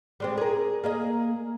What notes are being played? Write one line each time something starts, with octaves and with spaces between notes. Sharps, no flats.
G3 G#3 C4
G#4 A#4
A#3 G#4 D#5